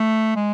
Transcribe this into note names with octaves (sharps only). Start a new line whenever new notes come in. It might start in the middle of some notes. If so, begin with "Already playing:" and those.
Already playing: A3
G#3